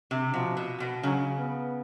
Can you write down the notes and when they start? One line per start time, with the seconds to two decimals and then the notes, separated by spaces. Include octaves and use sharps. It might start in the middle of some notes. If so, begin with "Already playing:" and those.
0.11 C3
0.34 B2 F3
0.57 B2
0.80 B2
1.03 C#3 F#3
1.39 B3